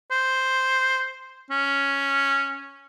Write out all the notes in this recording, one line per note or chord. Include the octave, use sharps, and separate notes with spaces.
C5
C#4